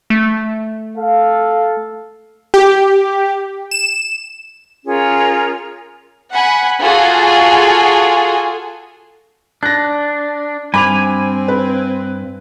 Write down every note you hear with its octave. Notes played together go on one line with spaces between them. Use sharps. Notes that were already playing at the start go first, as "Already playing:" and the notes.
A3
A4 F5
G4
E7
C#4 F4 G#4 A#4
F#5 G#5 B5
F4 F#4 G#4 A4 G#5
D4 F#6 A#6
G2 C4 G#5 B5 D6 F7
B4